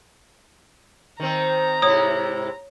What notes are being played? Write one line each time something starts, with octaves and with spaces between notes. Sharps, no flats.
D#3 C4 A#5
G#2 C3 E4 C#5 D#6